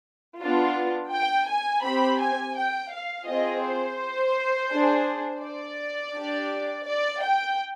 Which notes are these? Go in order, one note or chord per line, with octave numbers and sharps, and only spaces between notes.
B3 D4 F4
G5
G#5
C4 G4 B5
G#5
G5
F5
C4 F4 G#4 D#5
C5
D4 G#4
D5
D4 G4
D5
G5